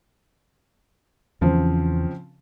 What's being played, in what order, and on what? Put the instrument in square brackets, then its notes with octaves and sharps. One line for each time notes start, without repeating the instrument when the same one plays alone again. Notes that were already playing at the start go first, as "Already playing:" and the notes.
[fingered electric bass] E2 E3 [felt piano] C#3 F3 C4